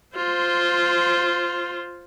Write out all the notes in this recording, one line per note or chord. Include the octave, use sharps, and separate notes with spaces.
F4 C5